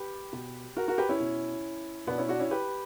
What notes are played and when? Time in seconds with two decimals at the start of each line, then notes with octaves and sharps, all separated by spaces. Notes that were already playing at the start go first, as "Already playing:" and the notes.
Already playing: G4 B4
0.33 B2
0.77 F#4 A#4
0.88 F#4 A#4
0.98 G4 B4
1.09 C#4 E4
1.20 B2
2.07 B2 B3 D4
2.18 C#4 E4
2.29 D4 F#4
2.40 C#4 E4
2.51 G4 B4